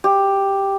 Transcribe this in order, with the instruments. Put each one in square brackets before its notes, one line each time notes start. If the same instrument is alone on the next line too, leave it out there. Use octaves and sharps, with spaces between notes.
[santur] G4